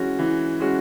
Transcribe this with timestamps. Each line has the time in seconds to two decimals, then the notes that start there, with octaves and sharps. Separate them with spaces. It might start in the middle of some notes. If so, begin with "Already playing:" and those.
Already playing: E3 G#3 C#4 F#4
0.19 E3
0.60 G#3 C#4 F#4